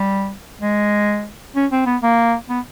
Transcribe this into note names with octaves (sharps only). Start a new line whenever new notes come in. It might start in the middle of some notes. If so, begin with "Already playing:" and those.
Already playing: G3
G#3
C#4
C4
B3
A#3
B3